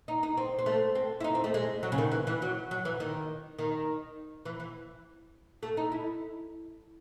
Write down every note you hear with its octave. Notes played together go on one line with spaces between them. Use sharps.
D#4
D#4
C4
C4
A3
C4
E4
D#4
C4
A3
G#3
F#3
C#3
D#3
E3
E3
F#3
F#3
E3
D#3
D#3
E3
E3
A3
D#4
E4